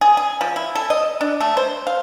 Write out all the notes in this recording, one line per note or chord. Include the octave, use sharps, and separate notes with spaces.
G#4
G#4
F3
E4
A4
D#5
D4
A3
C5
F5